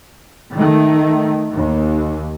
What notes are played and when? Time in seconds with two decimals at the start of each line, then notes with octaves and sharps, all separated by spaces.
0.54 D#3 A3
1.53 D#2